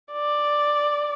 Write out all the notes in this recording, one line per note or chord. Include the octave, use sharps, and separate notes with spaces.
D5